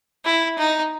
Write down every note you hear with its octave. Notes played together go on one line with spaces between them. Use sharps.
E4
D#4